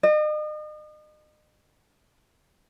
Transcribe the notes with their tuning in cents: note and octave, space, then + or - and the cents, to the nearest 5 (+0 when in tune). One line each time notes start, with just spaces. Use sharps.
D#5 -40